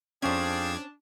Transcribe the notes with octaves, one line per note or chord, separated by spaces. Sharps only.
F2 C#4 D4 G#4 C5 F5 G5 G#6